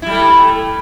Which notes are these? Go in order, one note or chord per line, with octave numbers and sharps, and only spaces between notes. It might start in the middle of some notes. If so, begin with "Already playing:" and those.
G3 A3 E4